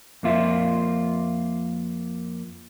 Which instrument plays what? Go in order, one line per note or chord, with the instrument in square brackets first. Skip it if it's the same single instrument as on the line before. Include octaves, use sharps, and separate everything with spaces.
[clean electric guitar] F2 A#3 F4 E5